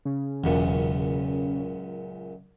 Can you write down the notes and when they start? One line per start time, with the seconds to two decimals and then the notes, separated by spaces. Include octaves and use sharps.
0.05 C#3
0.44 E1 C#2 F#2 A#2 E3